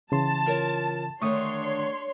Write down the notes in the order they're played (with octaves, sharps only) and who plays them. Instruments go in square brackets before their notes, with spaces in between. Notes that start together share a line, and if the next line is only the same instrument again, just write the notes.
[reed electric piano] C#3 E3 C6 [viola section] A5
[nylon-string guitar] F4 A#4 C#5
[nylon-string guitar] D3 D#3 A3 [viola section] D4 C#5 C6 [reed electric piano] C#6 D#6